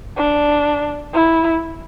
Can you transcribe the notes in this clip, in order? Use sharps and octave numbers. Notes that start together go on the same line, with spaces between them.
D4
E4